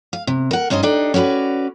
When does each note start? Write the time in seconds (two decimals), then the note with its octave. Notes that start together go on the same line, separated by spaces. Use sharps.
0.13 F5
0.27 C3
0.51 A#4 F#5
0.70 G2 C#4 D#4 C5 D#5
0.83 D4 D#4 G4 A4
1.14 C#4 F#4 A#4 B4 D5